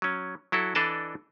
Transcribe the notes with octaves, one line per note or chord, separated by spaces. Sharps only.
F#3 C#4
F#3 E4 F#4 A4
E3 D4 A4 D5 D#5 A5